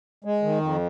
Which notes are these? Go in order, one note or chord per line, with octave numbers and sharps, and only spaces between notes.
G#3
D#3
F2